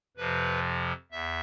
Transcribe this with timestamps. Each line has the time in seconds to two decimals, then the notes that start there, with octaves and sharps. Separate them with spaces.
0.17 F2 C3 F3 B4
1.11 E2 E5